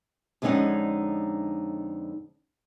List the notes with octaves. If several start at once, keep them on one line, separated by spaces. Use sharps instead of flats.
F2 D3 G#3 C#4 D#4 F#5